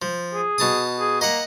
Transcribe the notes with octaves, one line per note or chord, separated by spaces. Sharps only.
F3
G#4
B2 A5 D#6
G#4
A#3 D#5 F#5